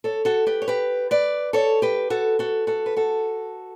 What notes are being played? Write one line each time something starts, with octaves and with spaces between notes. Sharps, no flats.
A4 C#5
F#4 A4
G4 B4
C#5
G4 B4
B4 D5
A4 C#5
G4 B4
F#4 A4
F#4 A4
F#4 A4
B4
F#4 A4